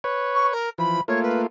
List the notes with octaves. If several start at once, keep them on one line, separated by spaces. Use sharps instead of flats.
B4 C#5
C#6
A#4
E3 F3 B5
A3 A#3 F4 C#5
B4